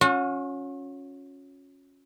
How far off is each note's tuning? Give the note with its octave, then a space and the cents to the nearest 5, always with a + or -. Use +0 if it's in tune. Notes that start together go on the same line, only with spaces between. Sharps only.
C#4 +0 F#4 -40